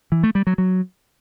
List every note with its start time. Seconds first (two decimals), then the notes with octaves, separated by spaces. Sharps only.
0.12 E3
0.23 A3
0.35 G3
0.47 F#3
0.58 F#3